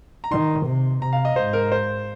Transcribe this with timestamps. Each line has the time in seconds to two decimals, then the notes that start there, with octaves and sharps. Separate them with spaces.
0.24 A#5
0.31 D#3 C6
0.67 C3
1.02 C3 A#5
1.13 F5
1.25 D#5
1.36 G#2 C5
1.53 A#4
1.72 C5